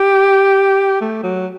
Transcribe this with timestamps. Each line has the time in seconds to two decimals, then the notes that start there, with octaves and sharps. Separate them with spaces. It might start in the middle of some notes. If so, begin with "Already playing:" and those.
Already playing: G4
1.01 A3
1.23 F#3